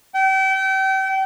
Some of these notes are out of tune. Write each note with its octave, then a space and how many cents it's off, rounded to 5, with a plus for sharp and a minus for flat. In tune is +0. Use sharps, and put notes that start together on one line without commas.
G5 -35